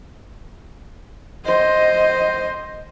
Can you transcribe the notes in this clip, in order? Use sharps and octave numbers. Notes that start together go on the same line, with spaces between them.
C5 D#5